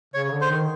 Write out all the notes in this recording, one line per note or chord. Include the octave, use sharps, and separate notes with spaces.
C#3 C#5
D3
C5
D#3